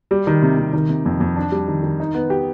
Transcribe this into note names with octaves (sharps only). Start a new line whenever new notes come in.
G3
D#3
C3
C3
D#3
C3
F2
F2
D4
G3
D#3
D#3
D#4
B3
G4